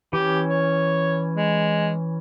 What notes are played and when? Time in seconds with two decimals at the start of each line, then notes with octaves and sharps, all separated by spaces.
0.13 E3 C#4 G4
0.49 C#5
1.36 G#3